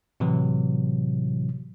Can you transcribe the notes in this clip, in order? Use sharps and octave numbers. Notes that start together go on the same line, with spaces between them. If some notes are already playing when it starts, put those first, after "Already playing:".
A2 C3 E3 F#3